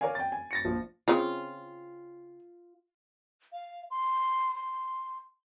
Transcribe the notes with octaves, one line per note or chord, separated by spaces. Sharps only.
A#4 C#5 D5 F5 G#5
G5 A6
G#5
A6 A#6 C#7
A#1 F3
C#3 C4 C#4 F4
F5
C6
C6